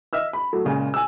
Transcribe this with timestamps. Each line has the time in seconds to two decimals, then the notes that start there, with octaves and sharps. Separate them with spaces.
0.13 D#5 E5 E6 F6
0.33 B5
0.53 F#3 A3
0.65 A#2 C#3 G#3
0.94 G#5 E6